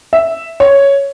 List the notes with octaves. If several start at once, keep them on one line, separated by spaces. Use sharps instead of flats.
E5
C#5